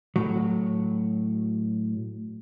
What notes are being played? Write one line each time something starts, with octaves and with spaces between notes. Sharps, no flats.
A2 F#3